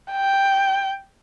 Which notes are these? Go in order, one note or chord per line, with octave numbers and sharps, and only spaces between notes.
G5